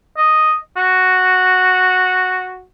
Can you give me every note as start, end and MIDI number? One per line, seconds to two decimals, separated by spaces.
0.17 0.55 75
0.77 2.63 66